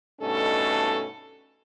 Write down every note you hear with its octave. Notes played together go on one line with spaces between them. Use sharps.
G2 B2 A3 C#4 D#4 A4